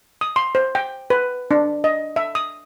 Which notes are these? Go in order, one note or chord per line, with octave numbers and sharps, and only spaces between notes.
D#6
C6
C5
G5
B4
D4
D#5
E5
D#6